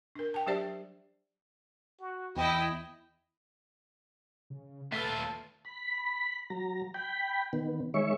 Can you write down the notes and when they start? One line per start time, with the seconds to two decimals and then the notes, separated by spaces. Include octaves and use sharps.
0.15 D4 A#4
0.34 G5 A5
0.46 F#3 D4 G4 C5 D5 E5
2.00 F#4
2.36 E2 E4 D#5 G5
4.50 C#3
4.92 D#2 A3 F4 B4 E5 A5 E6
5.65 B5
6.50 F#3 A#5
6.94 G5 B5
7.53 D#3 B3
7.94 D#3 G#3 C#5 E5 C#6